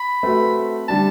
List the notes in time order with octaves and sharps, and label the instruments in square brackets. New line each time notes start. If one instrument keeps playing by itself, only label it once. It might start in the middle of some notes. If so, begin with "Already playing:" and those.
Already playing: [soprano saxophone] B5
[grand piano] A3 C4 F#4 B4
[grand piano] D3 G3 D4 [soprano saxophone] A5